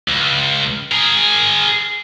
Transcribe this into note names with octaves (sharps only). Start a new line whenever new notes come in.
C#2
G#4 A#4